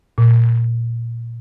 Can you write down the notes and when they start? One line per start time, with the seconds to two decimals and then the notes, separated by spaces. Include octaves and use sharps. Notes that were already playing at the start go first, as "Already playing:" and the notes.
0.18 A#2